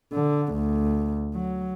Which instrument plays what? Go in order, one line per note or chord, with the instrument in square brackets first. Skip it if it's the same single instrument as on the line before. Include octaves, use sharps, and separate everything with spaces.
[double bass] D3
D2
F#3